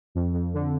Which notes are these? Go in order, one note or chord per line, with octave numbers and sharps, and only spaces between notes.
F2
F2
D3